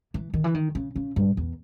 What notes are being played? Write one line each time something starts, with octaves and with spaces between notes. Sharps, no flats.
E3
D#3
E3
D#3
C#3
C#3
G2
E2